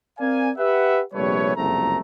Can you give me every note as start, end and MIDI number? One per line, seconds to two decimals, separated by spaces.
0.19 0.50 60
0.19 0.50 70
0.19 0.50 74
0.19 0.50 77
0.19 0.50 80
0.57 1.01 67
0.57 1.01 71
0.57 1.01 76
0.57 1.01 78
1.14 1.55 34
1.14 1.55 48
1.14 1.55 55
1.14 1.55 57
1.14 1.55 71
1.14 1.55 73
1.55 1.99 30
1.55 1.99 36
1.55 1.99 41
1.55 1.99 57
1.55 1.99 82